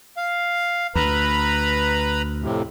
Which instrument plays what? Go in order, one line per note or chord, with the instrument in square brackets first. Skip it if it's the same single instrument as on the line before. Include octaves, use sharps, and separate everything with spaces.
[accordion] F5
[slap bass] D2 [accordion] B4 A#5 B5
[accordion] F2 A2 C3